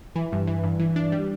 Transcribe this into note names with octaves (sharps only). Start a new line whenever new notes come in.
E3
G2
E3
G2
E3
D4
G3